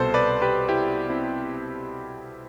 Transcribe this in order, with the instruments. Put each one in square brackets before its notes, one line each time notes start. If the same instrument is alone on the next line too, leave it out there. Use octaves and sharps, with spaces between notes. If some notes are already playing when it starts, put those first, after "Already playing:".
Already playing: [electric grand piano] C2 B2 A4 C5
B4 D5
G4 B4
E4 G4
C4 E4